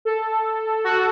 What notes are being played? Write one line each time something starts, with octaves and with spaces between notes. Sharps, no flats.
A4
F#4